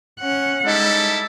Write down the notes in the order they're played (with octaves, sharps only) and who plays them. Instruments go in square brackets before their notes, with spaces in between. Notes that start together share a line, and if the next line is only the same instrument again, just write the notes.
[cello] C#4 F#5
[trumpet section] G3 E4 A4 [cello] G#3 [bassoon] D#4